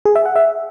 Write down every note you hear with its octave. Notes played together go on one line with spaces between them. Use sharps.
G#4
E5
F#5
E5